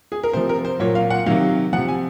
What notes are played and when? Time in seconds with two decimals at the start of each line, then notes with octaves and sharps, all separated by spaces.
0.12 G#4
0.23 A#4
0.33 C3 F3 C5
0.49 A#4
0.65 C5
0.80 A#2 F#3 C#5
0.95 F5
1.10 F#5
1.26 C3 D#3 F#3 F5
1.73 F3 F#5
1.77 C3
1.88 G#5